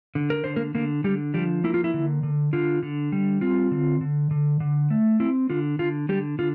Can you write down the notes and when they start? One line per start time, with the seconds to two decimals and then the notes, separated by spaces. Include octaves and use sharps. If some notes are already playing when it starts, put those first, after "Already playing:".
0.15 D3
0.30 A#4
0.44 D3 C5
0.56 A#3 A#4
0.75 D3 A#3 A#4
1.04 D3 G3 G4
1.34 F3 G3 G4
1.64 A#3 E4
1.74 F4
1.84 E4
1.94 D3
2.23 D3
2.53 D3 F4
2.83 D3
3.12 G3
3.41 C4 F4
3.71 D3
4.01 D3
4.31 D3
4.60 D3
4.90 A3
5.20 C4 E4
5.50 D3 F4
5.79 D3 F4
6.09 D3 G3 G4
6.39 D3 F4